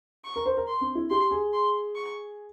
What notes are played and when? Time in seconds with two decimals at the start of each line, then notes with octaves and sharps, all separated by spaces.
0.24 C#6
0.36 A#4
0.46 C5
0.57 A#4
0.67 C6
0.81 C4
0.95 E4
1.10 G4 C6
1.31 G#4
1.53 C6
1.96 C#6